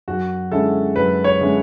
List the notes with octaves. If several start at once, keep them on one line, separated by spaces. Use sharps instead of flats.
F#2 F#4
D3 G#3 C#4 E4 A4
F#2 B4
C#5
D3 G#3 C#4 E4